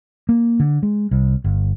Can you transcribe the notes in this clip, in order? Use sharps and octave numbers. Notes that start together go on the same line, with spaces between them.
A#3
D3
G#3
C2
G1